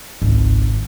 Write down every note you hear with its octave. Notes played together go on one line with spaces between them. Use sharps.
G#1 C#2